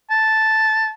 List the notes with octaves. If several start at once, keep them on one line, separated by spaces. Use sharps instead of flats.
A5